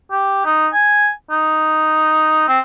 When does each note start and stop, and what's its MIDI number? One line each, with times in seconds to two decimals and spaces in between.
0.12 0.43 67
0.46 0.68 63
0.73 1.10 80
1.31 2.47 63
2.49 2.60 60